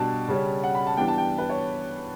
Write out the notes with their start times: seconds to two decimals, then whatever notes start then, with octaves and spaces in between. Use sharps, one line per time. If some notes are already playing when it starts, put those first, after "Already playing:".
Already playing: B2 G3 D4 A5
0.28 C#3 G3 C#4
0.64 F#5
0.75 B5
0.87 A5
0.97 E3 G3 B3 D4 G5
1.08 A5
1.18 G5
1.38 B4
1.49 C#5